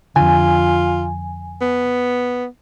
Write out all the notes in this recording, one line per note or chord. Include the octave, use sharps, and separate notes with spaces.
F2 D3 F4 G#5
B3